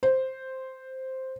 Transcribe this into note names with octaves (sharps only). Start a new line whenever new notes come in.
C5